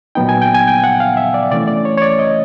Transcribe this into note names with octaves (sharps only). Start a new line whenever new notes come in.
A#2 F#3 B3 D#4 G5
G#5
G5
G#5
G5
F#5
F5
E5
D5
C3 E3 A3 C#4 D5
D5
C#5
C#5
D5
D#5